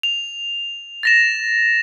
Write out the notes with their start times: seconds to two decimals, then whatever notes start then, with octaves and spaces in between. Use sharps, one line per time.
0.03 F7
1.03 A6 A#6 E7